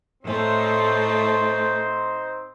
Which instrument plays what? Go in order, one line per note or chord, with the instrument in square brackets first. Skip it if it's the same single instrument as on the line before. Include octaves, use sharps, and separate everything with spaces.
[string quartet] A2 A3 [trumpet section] C4 D#4 C5